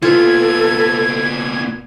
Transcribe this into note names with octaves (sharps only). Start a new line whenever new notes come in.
A#2 B3 F4 A4 G#6